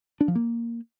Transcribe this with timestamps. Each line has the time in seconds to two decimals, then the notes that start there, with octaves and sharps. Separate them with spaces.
0.21 D4
0.28 F3
0.35 A#3